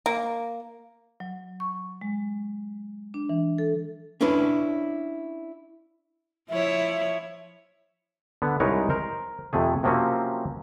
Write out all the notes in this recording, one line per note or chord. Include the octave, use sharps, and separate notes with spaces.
A#3
F#3
C#6
G#3
D4
E3
A4
C#4 D4 E4 B4
F3 E4 C#5 E5
D3 B3
C2 G#3 D#4 A#4 B4 C#5
A#4 C5
F2 C3 A3 G#4
C3 F3 F#3 A#3 C4 C#4